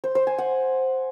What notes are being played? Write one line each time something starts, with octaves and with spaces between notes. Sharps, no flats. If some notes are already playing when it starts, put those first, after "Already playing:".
C5
C5
G#5
F#5